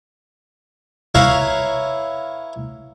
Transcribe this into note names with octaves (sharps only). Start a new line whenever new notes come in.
E4 B4 C#5 F5 A#5